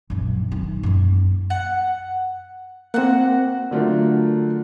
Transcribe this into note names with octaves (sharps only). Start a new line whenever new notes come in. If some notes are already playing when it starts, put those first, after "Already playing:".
A#1 F#2
F#2 D#3
F#2 A#3
F#5
A#3 C4 F#4 F#5
D3 F#3 A3 D4 F4 A#4